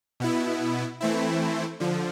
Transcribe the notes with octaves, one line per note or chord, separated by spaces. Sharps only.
B2 B3 E4
E3 A3 C4 E4
D3 F3